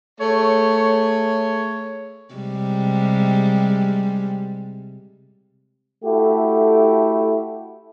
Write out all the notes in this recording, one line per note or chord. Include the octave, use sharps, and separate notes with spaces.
A3 G#4 C#5
C3 G3 G#3
A3 E4 F#4 G4 A4